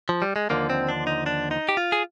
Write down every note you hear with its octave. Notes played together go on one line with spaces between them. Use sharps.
F3
G3
G#3
D#2 D3 F3 A#3
C4
D4
D#4
D4
D#4
G4
F4
G#4